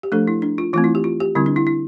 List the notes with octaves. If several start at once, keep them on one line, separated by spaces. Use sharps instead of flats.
G4
F3 A3 D4 A4
E4
D4
F4
E3 A3 C4 F4
E4
G4
F4
G4
D3 G3 C4 E4
D4
E4
E4